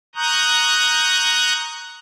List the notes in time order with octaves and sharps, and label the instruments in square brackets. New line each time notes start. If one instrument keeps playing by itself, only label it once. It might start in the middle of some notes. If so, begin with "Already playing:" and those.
[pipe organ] A#5 C#6 D#6 F#6 G6